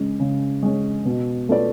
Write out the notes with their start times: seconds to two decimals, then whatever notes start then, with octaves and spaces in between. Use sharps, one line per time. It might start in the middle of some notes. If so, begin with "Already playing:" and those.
Already playing: C#3 G#3 C#4
0.20 C#3
0.63 G#3 C#4
1.05 B2
1.49 A3 F4 B4 D5